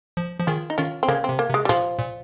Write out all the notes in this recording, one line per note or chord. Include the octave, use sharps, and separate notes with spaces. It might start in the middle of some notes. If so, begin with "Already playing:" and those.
F3
F3
D#3 F4 G#4
D#4
D#3 C#4 F4
C4
C#3 A#3 C#4
C3 C4
A#3
C3
G#3
G3
A#2 F3
A#2